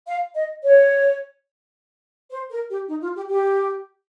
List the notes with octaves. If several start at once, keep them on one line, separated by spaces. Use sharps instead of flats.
F5
D#5
C#5
C5
A#4
G4
D#4
F4
G4
G4